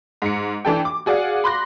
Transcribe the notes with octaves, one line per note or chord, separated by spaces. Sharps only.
G#2 C#7
E3 D4 A4 G5
D6
F#4 G#4 D5 F5 F#5
B5 C6 D6 F#6 A#6